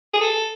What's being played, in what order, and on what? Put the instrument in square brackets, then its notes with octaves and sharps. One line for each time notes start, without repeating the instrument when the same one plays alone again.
[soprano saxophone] G#4
A4